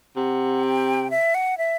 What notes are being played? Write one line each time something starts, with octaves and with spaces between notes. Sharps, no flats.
C3 F#5
G5
E5
F#5
E5